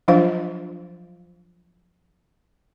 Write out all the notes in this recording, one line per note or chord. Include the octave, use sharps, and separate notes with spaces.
F3 F#3 D4 F4 C5 F5